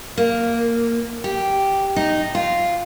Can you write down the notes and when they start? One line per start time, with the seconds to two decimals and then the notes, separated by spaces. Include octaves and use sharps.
0.18 A#3
1.24 G4
1.96 D#4
2.35 F4